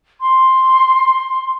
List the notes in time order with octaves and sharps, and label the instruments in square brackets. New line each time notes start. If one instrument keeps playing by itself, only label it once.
[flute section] C6